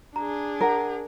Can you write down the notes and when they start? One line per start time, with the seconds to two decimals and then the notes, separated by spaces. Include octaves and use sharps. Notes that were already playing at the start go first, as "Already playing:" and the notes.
0.16 D4 G#4 A#5
0.61 A#4 F#5 A#5